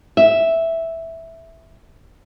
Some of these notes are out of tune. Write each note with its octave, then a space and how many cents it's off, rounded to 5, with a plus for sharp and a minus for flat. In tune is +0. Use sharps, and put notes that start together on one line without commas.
E5 -5